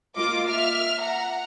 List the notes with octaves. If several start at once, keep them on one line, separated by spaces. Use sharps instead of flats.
A#3 F4 D#5 D6
E5 F6
F#5 A#5